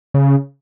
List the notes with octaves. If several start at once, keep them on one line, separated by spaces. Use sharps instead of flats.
C#3